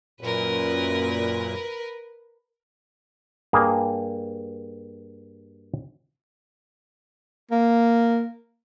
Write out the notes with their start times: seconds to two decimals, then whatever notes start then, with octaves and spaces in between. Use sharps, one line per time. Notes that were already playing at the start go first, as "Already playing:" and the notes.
0.21 F#2 A#2 A#4 B4
3.53 G2 A#3 G#4
7.51 A#3